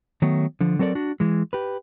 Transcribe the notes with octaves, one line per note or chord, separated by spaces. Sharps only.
D#3 F#3 A3 B3
D3 F3
F#3 C4 A4 A#4 D5
D4 F#4
E3 G#3
G4 B4